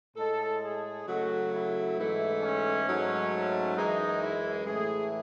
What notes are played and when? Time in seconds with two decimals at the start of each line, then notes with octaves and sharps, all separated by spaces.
0.17 A2 G#3 A4
0.62 G#4
1.07 C#3 F#3 A3 F#4
1.52 E4
1.97 G#2 E3 A3
2.42 C#4
2.87 G#2 F#3 A3
3.76 F#2 E3 G#3 D#4
4.22 E4
4.67 A2 E3 A3 G#4